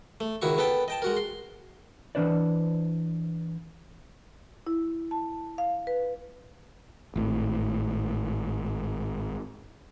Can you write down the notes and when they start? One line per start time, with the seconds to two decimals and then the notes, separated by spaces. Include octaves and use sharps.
0.20 A3
0.42 C#2 D#3 E4 F#4 C#6
0.58 B3 A4 B4 G5
0.88 D#5 G5 A5
1.02 G#3 F#4 A#4
1.17 C6
2.15 E3 G#3 D4 B4 C5 D5
4.67 E4
5.11 A5
5.58 F5
5.87 B4
7.16 G#1 A2